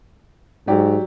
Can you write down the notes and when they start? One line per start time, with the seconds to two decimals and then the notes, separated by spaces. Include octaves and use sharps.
0.68 G#2 F#3 G4 D5